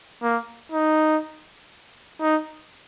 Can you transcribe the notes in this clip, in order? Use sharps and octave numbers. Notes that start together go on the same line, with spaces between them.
A#3
D#4
D#4